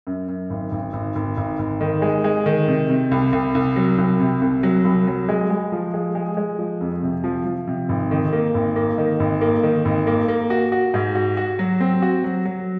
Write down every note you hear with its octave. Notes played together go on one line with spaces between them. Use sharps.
F#2
F#2
G#1
G#1
G#1
G#1
G#1
G#1
D#3
G#3
G#3
D#3
C3
C3
C2
C2
C2
F#3
C2
C3
C2
F#3
C2
F#3
G#3
G#3
F3
G#3
G#3
G#3
F3
F2
C3
F3
F3
C3
G#1
D#3
A#3
G#1
A#3
D#3
G#1
A#3
D#3
G#1
A#3
A#3
F#4
F#4
G#2
F#4
F#4
F#3
C4
F#4
F#3
F#3